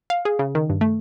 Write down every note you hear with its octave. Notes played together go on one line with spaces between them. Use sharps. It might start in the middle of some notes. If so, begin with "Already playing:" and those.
F5
G#4
C#3
D#3
G2
A3